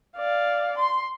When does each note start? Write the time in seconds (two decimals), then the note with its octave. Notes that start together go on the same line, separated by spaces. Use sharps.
0.17 D5 F5
0.78 C6